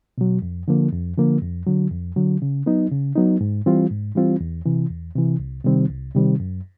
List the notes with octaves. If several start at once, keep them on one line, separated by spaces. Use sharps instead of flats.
B2 F#3
F2
D3 F3 A#3
F2
D3 F3 A#3
F2
D3 F#3
F2
D3 F#3
C#3
F#3 B3 D#4
C#3
F#3 B3 D#4
G#2
E3 G3 C4 F4
G#2
E3 G3 C4 F4
E2
C3 E3
E2
C3 E3
C2
C3 D#3 G3 C4
C2
C3 D#3 G3 C4
F#2